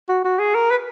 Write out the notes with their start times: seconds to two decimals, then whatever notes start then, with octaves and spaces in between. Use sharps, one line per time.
0.09 F#4
0.24 F#4
0.39 G#4
0.55 A#4
0.71 B4